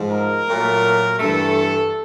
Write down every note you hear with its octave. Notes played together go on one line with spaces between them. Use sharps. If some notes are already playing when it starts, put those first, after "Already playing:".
Already playing: G#2 F3 G#3
A#4
A#2 F#3 A3
G2 E3 A3 A4